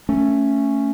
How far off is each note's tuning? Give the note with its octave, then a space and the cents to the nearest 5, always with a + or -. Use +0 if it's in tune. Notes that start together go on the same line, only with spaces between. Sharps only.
A3 +10 C#4 +0